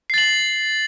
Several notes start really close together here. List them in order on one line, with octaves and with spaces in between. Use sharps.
C7 A6 F#7